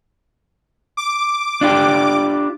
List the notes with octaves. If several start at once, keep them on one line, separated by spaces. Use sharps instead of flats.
D6
D4 F4 G4